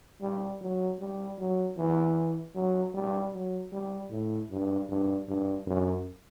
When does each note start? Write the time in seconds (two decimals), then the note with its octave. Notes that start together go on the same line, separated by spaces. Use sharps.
0.21 G3
0.61 F#3
1.00 G3
1.38 F#3
1.78 E3
2.55 F#3
2.94 G3
3.33 F#3
3.72 G3
4.11 A2
4.50 G2
4.89 G2
5.28 G2
5.67 F#2